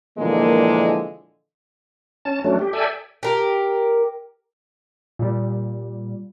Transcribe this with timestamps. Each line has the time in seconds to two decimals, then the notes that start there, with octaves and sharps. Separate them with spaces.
0.18 A#2 D3 E3 F3 G#3 A#3
2.25 C#4 A5
2.44 F#3 A3 C#4 D4
2.59 G4
2.73 A4 D5 E5 G5 G#5
3.23 G4 A#4
5.19 A#2 G3